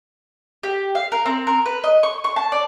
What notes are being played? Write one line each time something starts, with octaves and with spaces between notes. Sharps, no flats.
G4
F5
A#4
C4
A#4
B4
D#5
C#6
C#6
A5
D5